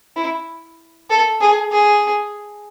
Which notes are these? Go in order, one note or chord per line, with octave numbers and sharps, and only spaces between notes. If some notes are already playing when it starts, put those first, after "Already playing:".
E4
A4
G#4
G#4